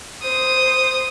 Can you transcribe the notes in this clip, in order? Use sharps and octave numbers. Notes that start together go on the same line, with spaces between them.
C5 D#6